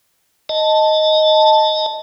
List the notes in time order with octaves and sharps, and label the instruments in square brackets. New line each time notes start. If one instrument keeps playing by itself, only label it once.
[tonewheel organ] D#5 A5